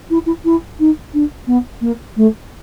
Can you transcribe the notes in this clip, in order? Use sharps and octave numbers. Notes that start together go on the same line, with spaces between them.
E4
E4
E4
D#4
D4
B3
A#3
A3